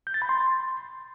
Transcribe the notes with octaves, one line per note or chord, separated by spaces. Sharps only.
G6
A6
B5
C6